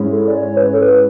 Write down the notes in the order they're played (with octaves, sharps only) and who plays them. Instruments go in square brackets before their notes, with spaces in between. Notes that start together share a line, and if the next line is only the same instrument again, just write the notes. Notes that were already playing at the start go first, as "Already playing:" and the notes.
Already playing: [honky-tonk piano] G#2 G#3 C#4 E4
[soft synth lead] A4
D5
C#5
B4
C#5
A4
B4